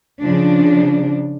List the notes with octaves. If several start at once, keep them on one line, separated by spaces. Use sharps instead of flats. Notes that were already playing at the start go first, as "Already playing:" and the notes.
C#3 F3 D4